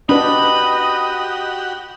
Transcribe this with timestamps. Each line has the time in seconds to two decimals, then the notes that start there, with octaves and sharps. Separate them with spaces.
0.09 D4 F#4 G4 B4 D#5 B5